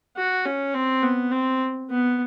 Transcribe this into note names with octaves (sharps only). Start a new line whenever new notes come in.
F#4
C#4
C4
B3
C4
B3